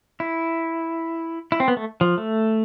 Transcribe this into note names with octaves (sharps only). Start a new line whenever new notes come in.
E4
E4
C4
B3
A3
F3
A3